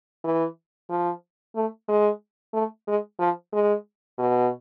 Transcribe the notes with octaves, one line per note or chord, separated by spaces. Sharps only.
E3
F3
A3
G#3
A3
G#3
F3
G#3
B2